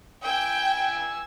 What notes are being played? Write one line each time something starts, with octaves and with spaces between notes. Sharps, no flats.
G5 G#5 E6